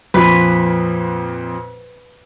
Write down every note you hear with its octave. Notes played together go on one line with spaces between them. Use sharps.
F2 A#2 F3 B4